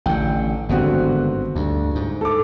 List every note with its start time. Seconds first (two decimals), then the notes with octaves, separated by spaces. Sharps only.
0.06 A1 D3 G5
0.69 G#1 G2 D3 B3 C4 F#4
1.55 D2 G2
1.95 G#2
2.21 A4 D6